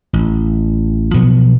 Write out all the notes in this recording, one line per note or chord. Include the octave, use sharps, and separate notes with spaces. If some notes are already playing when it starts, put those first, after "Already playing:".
A1
B2 F3 F#3 B3